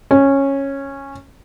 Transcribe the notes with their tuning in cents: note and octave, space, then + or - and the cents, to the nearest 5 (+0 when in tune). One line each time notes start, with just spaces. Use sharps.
C#4 -10